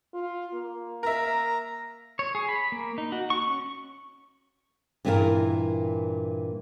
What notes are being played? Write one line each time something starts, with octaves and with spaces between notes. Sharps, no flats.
F4
A#3
A#4 E5 A#5
C#5
G#4
B5
A#3
D#4
F#4
C#6
C#4
G2 A#2 E3 E4 F4 A#4